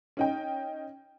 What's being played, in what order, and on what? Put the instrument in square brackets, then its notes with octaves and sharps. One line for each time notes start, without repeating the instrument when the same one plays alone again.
[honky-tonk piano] C#4 D#4 G5